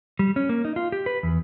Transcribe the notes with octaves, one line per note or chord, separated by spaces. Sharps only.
G3
C#4
A#3
D#4
F4
G4
B4
E2